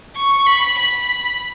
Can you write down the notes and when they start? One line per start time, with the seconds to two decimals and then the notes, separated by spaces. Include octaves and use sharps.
0.16 C#6
0.47 B5
0.78 B5